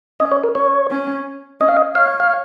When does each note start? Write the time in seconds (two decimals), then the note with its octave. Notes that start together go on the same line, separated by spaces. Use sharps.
0.20 C#4 D#5
0.31 C#5
0.43 A#4
0.55 C#4 C#5
0.91 C#4
1.60 C#4 D#5
1.68 F5
1.77 D#5
1.95 C#5 F5
2.20 F5